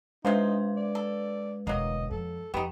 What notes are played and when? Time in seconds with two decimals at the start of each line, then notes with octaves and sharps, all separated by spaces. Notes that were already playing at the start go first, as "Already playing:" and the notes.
0.25 C3 G#3 D#4 F4 B4 C5
0.77 D5
0.95 A4
1.67 E1 D2 F#3 A#3 D#5
2.11 F2 A4
2.54 F2 B3 D#4 G4 G5